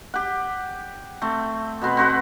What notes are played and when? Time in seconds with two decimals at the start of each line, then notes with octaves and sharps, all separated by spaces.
0.14 G4 F#5
1.22 A3 C4
1.82 B2 B3 C4 B4
1.97 C4 F#4 B4 F#5